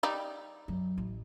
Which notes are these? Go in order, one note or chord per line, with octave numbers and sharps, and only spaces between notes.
G3 D#4
F#2
A1